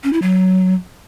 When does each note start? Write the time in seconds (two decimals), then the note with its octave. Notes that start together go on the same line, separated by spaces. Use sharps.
0.04 C#4
0.13 E4
0.22 F#3